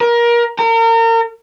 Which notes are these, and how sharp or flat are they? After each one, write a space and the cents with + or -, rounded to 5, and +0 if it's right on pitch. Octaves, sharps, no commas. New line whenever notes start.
A#4 +25
A#4 -35